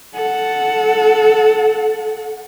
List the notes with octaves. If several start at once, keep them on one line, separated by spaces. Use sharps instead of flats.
A4 F#5